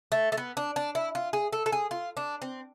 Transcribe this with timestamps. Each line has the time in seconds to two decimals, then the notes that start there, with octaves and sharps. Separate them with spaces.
0.12 A3
0.32 A3
0.38 B3
0.57 D4
0.76 D4
0.95 E4
1.15 F4
1.33 G#4
1.53 A4
1.66 A4
1.72 G#4
1.91 F4
2.17 D4
2.42 C4